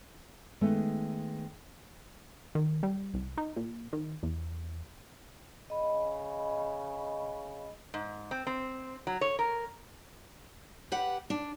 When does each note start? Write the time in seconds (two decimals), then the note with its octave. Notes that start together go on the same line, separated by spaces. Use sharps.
0.61 D#3 G#3 A3 B3
2.55 D#3
2.83 G3
3.14 C2
3.37 D#4
3.56 A#2
3.93 D#3
4.23 E2
5.70 C#3 D#5 B5
7.94 G#2
8.31 C4
8.47 C4
9.07 F#3
9.21 C#5
9.39 A#4
10.92 G4 B4 F#5
11.30 D4